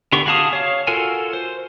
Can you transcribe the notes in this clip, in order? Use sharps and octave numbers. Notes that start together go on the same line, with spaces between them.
D3 B3 G4 C#6
F#4 G#4 F5 A5 D#6
C#5 F5
F4 F#4 A4 A#4 G#5
C5